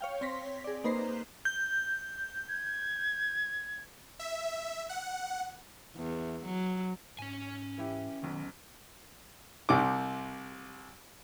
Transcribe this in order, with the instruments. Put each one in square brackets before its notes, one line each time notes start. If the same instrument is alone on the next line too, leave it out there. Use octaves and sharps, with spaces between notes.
[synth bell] C#5 F5 G5
C4 C#5 C6 A#6 B6
G#4 D5
A#3 D#4 B4 C5 A#5 C7
[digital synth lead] G6
[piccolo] G#6
[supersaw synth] E5
F#5
[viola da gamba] E2
F#3
[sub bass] G#2 [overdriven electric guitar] C#4 G#5
[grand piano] E3 E4 G4
[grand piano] F#1 B1 [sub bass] D#3
[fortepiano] C2 C3 D6